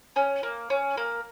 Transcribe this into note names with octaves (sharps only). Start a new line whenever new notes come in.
C#4
A#3
C#4
A#3